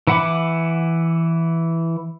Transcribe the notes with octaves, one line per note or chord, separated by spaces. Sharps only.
E3 E4 F#5 B5 D6